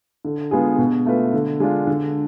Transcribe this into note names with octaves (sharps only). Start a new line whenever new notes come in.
D3
G#3 B3 F4 G#4
B2
A3 F4 B4
D3
G#3 D4 F4
D3